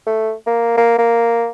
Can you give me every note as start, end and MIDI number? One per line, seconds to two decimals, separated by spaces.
0.07 0.33 57
0.47 0.72 58
0.77 0.97 58
0.98 1.49 58